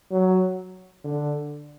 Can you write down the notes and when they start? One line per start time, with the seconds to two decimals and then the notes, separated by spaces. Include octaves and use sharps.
0.11 F#3
1.04 D3